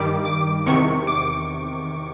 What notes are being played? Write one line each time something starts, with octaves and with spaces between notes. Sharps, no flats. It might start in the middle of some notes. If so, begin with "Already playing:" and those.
Already playing: G2 D#3 G3 D6
D6
E2 C3 D#3 C#6
D6